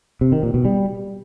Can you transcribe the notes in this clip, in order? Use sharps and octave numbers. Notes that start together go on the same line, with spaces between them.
C3
D#3
A#2
B2
G3